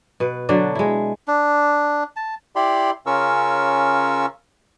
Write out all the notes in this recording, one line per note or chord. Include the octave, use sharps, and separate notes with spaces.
B2 B4
D3 F#3 D4
G#3 E4
D4
A5
E4 G4 D5 B5 C6
C#3 C#4 F4 A#4 C#6 E6